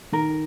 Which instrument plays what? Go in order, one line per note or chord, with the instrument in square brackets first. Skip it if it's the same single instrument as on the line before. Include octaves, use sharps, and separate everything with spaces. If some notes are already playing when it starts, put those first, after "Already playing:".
[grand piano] D#3 [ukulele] A#4